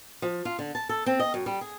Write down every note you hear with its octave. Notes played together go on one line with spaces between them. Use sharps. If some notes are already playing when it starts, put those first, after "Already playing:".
F3
F4
D3
A5
A4
C4
D#5
F#2
G3
G#4